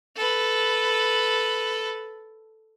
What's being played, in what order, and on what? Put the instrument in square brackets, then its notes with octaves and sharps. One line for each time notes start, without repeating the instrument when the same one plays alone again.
[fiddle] A4 B4